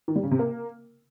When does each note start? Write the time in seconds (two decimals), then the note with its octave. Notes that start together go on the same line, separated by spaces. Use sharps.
0.08 D#3
0.16 G3
0.24 C#3
0.31 C3
0.39 A#3